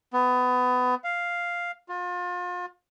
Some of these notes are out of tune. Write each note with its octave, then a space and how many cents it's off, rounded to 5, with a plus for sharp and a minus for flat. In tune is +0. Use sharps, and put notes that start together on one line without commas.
B3 +25
F5 +0
F4 +35